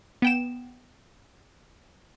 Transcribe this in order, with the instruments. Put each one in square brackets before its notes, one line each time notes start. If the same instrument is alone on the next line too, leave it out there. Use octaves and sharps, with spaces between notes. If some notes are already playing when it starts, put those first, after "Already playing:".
[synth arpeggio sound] B3 G5 E7